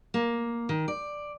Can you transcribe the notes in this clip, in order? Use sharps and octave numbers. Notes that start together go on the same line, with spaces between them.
A#3
D#3
D5